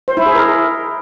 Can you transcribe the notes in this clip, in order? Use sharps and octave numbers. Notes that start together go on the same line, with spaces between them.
C5
E4
G#4
A#4